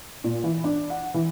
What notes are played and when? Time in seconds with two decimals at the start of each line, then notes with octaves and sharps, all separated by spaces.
0.24 A#2
0.44 E3
0.64 D4
0.90 F#5
1.14 E3